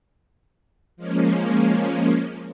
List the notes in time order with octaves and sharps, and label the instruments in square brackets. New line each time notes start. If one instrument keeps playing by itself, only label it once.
[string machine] F3 G#3 A#3 C#4